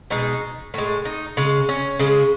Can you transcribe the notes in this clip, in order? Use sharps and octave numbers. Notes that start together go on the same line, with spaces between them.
B2 G#3 D#4
A2 G#3
D#4
C#3 G#3
C#4
C#3 G#3